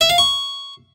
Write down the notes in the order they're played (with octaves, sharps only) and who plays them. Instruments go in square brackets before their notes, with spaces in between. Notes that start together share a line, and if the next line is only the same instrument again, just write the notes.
[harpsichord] E5
F5
C#6